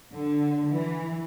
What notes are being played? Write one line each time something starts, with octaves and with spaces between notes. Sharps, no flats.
D3
E3